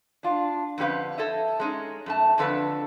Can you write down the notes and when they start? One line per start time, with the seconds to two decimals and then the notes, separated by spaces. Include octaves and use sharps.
0.23 D4 F4
0.78 F2 D3 C#4 G4 B4 F5
1.18 A4 C#5 D#5 E5
1.60 G#3 C#4 D#4
2.06 F#2 A3 A5
2.38 F2 D3 A4 B4 C#5